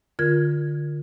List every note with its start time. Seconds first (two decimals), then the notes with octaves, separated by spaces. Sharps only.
0.19 D3 F4 A#4 G#6